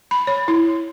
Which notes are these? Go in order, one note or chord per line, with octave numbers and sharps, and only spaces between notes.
B5
C#5
E4